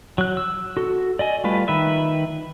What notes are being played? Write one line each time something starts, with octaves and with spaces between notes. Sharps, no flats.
F#3 F#6
E6
F#4 A4
D5 D#5 G#5
G3 A3 F4 B4
D#3 B4 E5